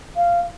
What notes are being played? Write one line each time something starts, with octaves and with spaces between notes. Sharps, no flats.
F5